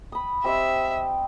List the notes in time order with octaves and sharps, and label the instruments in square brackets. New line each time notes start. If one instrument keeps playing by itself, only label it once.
[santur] B5 D#6
[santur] C4 G4 D#5 [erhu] E5